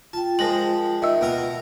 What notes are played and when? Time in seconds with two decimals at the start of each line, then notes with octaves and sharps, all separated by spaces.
0.13 F4 G5 A5
0.39 F3 G#3 A#4 A#6 F#7
1.02 D#3 D#5 E5 E6
1.21 B2 A#4 F5